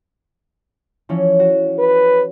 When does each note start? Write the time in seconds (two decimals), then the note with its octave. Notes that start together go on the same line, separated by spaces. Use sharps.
1.09 E3 F3 C#4
1.39 F#4
1.79 B4